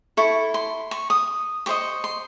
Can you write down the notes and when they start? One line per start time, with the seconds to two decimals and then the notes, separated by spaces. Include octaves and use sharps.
0.17 E4 A4 C#6
0.54 C6
0.91 C#6
1.10 D#6
1.66 G4 C5 D#5 C#6
2.04 C6